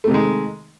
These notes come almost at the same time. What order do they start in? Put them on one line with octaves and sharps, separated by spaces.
A3 C3 D#3 G#3